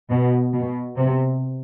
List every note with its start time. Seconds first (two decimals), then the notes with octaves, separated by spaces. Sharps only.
0.10 B2
0.53 B2
0.97 C3